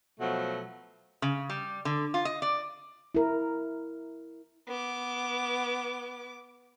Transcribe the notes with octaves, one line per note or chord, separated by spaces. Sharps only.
B2 F3 F#3 A3
C#3
G3
D3
F4
D#5
D5
E4 A#4
B3 D6